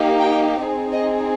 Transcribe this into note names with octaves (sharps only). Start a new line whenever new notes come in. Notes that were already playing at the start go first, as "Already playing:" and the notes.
Already playing: A#3 D#4 G4
G5
C4 D#4 G#4
D#5